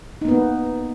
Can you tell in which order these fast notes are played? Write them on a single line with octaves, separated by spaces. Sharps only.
D#4 A#3 B3